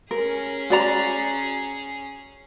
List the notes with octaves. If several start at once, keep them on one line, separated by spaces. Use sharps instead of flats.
C#4 G#4 A#4
F#4 D5 A#5